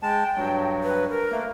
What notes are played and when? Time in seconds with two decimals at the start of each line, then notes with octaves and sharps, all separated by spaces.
0.03 G#3 G5 A5
0.36 G2 F#3
0.83 B4
1.10 A#4
1.31 A3 A#3